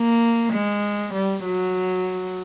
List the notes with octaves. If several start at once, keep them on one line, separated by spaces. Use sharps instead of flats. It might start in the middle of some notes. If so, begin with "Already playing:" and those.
Already playing: A#3
G#3
G3
F#3